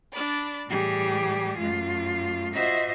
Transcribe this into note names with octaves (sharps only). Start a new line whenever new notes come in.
D4 D5 B5
A2 E3 G3 G4 G#4
F#2 A3 F4
F4 F#4 C5 D#5 E5